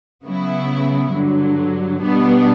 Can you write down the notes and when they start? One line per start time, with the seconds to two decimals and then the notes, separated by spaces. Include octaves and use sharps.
0.24 C#3 F#3 B3 E4
1.12 G2 D3 F#3
2.01 B2 G3 B3 D4